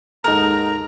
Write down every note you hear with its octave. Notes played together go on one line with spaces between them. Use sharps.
D#2 G#2 D#4 A4 A#4 A#5